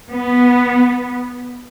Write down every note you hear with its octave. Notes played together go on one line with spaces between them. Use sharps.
B3